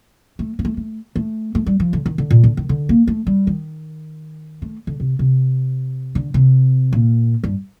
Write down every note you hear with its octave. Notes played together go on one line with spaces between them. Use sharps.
A3
A#3
A3
A3
A3
A3
G3
F3
D3
D#3
D3
A#2
D3
D#3
D3
A#3
A3
G3
D#3
A3
D3
C3
C3
D3
C3
A#2
G2